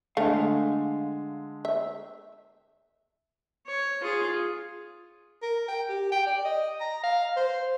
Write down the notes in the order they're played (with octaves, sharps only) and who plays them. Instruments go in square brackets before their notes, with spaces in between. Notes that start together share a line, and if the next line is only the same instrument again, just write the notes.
[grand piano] D3 G#3 D4 [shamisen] A3 [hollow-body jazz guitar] F5
[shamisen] E5
[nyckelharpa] C#5
F4 G#4
[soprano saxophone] A#4
G5
G4
G5
D5
D#5
A#5
F5
C5